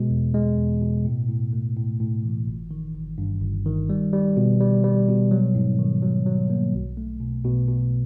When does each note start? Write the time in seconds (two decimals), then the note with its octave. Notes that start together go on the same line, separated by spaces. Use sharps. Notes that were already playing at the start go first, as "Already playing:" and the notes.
Already playing: B2 G#3
0.10 E2
0.34 G#3
0.58 E2
0.81 B2
1.05 A2
1.29 A2
1.53 A3
1.76 A2
2.00 A2
2.24 E3
2.47 G1
2.71 D#3
2.95 G1
3.18 G2
3.42 G1
3.66 D#3
3.89 G3
4.13 G3
4.37 B2
4.60 G3
4.84 G3
5.08 B2
5.31 F#3
5.55 G#2
5.79 D#3
6.03 F#3
6.26 F#3
6.50 A#3
6.74 B1
6.97 A3
7.21 B2
7.45 B2
7.68 B2